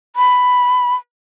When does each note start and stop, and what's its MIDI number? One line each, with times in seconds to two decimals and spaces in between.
0.16 0.95 83